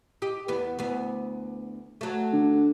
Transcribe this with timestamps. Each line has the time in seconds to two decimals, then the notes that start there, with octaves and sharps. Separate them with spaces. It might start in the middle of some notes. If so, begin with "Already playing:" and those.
0.22 G4 D#5
0.48 E2 B3
0.79 D2 B3
2.01 F#3 A3
2.33 D3